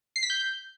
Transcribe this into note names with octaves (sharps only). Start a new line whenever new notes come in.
C7
B6
G6